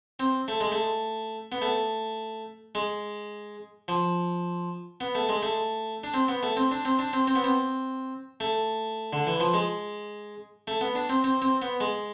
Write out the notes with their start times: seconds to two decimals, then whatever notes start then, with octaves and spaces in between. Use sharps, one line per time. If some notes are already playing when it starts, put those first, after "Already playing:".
0.20 C4
0.48 A3
0.61 G#3
0.72 A3
1.52 B3
1.62 A3
2.75 G#3
3.88 F3
5.01 B3
5.15 A3
5.29 G#3
5.42 A3
6.04 D4
6.14 C4
6.28 B3
6.43 A3
6.57 C4
6.71 D4
6.85 C4
6.99 D4
7.13 C4
7.28 C4
7.35 B3
7.44 C4
8.40 A3
9.13 D3
9.27 E3
9.40 F3
9.54 G#3
10.68 A3
10.81 B3
10.95 D4
11.09 C4
11.24 C4
11.42 C4
11.62 B3
11.80 G#3